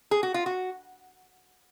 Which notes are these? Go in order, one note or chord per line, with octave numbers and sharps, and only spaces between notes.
G#4
F#4
F4
F#4